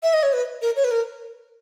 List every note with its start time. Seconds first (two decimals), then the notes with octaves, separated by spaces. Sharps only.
0.03 E5
0.14 D#5
0.23 C#5
0.33 B4
0.62 A#4
0.76 C#5
0.84 B4
0.91 A#4